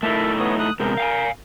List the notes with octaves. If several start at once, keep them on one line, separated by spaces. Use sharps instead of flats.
A3 D#4 E4 A#4 E5 A5
B3 C#5 D#6
D#6 F#6
C3 G#3 B3 A#4 G6
F5 G5 G#5